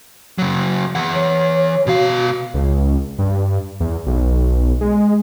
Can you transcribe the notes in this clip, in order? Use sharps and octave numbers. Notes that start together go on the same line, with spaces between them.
C#3 F#3
E3 F#5
C#5
B2 F#4 F5
C#2
G2
E2
B1
G#3